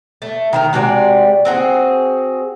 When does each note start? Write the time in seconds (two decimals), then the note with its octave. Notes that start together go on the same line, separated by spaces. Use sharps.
0.22 A3
0.53 D#3 A4 A#4
0.73 C3 G#3 F#4 D5
1.45 C4 F#4 G#4